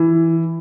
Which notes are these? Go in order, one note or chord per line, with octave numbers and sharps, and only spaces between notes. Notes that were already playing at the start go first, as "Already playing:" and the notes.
Already playing: E3